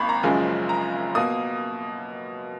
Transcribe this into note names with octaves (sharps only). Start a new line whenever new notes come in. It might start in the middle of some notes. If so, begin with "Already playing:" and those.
Already playing: G#1 A#3 B5 C#6
A#5
F#1 F#2 C#3 F3 G#3 G#5
A#5
B2 A#3 D#6